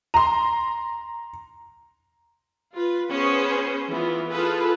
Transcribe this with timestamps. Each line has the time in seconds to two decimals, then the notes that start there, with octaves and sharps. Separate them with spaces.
0.14 A#5 C6
2.74 F4 B4
3.10 B3 C#4 G#4 B4 C5
3.88 E3 B3 F4
4.29 F4 G#4 A4 B4